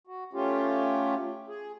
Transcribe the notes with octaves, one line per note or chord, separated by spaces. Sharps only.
F#4
A3 C#4 F4 G4
G#4